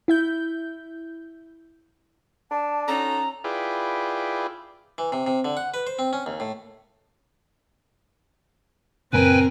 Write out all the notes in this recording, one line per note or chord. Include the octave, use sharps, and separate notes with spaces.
E4 E5 G6
D4 A5
C#4 D#4 F#4 A4 A#5
E4 F4 G#4 B4 D5 G5
E3
C3
C3
D3
F#5
B4
C5
C4
C#4
D#2
A2
F#2 A#2 C#3 C4 A#4 B4 G5 G#5